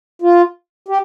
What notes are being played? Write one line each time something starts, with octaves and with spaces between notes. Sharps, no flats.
F4
G4